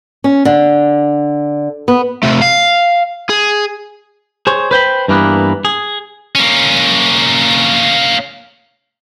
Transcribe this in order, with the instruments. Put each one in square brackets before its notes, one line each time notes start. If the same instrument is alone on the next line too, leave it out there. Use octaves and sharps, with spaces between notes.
[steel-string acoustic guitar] C#4
D3
B3
[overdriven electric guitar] C3 A3
F5
G#4
[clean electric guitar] G#4 C5 C#5
B4 C5 G5 B5
G2 E3 A#3 B3
G#4
[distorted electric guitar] A#3 C#4